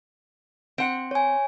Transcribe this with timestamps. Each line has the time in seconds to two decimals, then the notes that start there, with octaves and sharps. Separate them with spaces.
0.78 C4 F#5
1.11 C#5 G#5